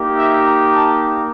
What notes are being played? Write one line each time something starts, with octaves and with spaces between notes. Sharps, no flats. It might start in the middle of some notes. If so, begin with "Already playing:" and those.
Already playing: A#3 D#4 G4
E5
A#5
A5